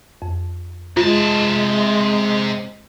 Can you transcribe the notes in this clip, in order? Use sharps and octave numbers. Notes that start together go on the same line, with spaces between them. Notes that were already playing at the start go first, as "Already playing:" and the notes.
F2
C3 G#3 F4 A5